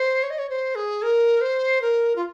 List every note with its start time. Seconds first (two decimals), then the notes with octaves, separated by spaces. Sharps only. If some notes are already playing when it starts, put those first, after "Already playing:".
Already playing: C5
0.23 C#5
0.30 D#5
0.39 C#5
0.49 C5
0.75 G#4
1.02 A#4
1.41 C5
1.82 A#4
2.16 F4